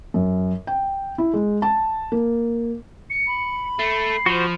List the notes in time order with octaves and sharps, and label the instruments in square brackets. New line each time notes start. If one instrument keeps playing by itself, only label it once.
[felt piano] F#2
G5
E4
G#3
A5
A#3
[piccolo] C#7
[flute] B5
[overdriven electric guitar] A3 [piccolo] C7
[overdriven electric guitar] F3 [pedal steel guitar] F#4 C5